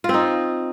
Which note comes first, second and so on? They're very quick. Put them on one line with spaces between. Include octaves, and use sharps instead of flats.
F4 C4 D#4